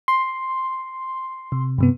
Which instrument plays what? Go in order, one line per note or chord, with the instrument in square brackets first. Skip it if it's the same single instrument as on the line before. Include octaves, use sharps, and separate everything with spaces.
[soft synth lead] C6
[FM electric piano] C3
G2 C3 B3